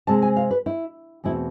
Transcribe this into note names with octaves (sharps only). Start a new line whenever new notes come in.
C3 G#3 C4 A5
G#5
F5
B4
E4
E2 B2 A3 C4 E4